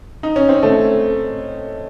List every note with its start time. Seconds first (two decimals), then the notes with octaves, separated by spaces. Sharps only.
0.23 D#4
0.36 C#4
0.49 C4
0.63 A3